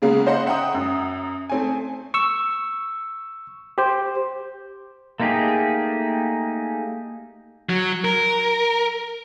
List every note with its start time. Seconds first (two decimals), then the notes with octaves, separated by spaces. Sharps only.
0.02 C#3 G#3 A#3 B3
0.27 C5 D#5 F#5 C6
0.46 E5 F#5 G5 A#5 D#6
0.74 F#2
1.50 A3 C4 G#5
2.14 C#6 E6
3.78 G4 C5
5.20 A3 A#3 D#4 G4 G#4
7.69 F#3
8.05 A#4